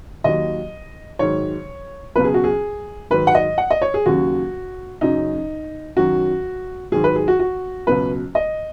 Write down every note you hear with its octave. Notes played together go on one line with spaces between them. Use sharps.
D#2 D#3 F#3 D#5
G#2 D#3 F#3 C#5
C#2 B2 F#3 B4
G#4
F#4
G#4
G#2 D#3 F#3 B4
F#5
D#5
F#5
D#5
C#5
G#4
D#2 C#3 F#3 F#4
F#2 C#3 F#3 D#4
F#2 D#3 F#3 F#4
G#2 D#3 F#3 G#4
B4
G#4
F#4
F#4
C#2 B2 F#3 B4
D#5